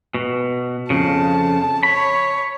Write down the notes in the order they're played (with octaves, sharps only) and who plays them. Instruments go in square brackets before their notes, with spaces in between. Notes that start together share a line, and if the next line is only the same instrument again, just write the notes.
[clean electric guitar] B2
[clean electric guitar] F2 C#3 [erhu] A5
[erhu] C#5 [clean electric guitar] B5